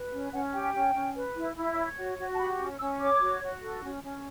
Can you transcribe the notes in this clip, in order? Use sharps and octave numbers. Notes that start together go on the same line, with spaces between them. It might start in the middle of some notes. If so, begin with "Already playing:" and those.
Already playing: B4
C#4
C#4 F#5
G4 G5
C#4
C#4
B4
E4
E4
C#5
F#4
F#4
A5
G4 B5
C#4
C#4 E6
C#5 D6
F#4
F#4
A4
C#4
C#4